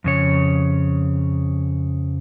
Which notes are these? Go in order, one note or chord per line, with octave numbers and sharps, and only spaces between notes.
F2 C#3 C#5